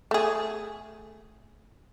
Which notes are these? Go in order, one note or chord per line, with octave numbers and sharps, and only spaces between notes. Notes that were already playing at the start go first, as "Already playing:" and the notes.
A3 G#4